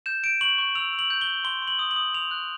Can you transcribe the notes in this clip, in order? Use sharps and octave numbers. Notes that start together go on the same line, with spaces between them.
G6 E7
G6 D7
C#6 F#7
C#6
E6 F7
E6
F#7
G6
G7
G6
C6 G7
C6
F#7
D#6
F#7
D#6
D#6 F7
F#6